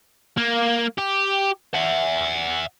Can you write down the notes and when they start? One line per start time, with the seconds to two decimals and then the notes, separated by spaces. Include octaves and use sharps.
0.37 A#3
0.98 G4
1.74 E5 F#5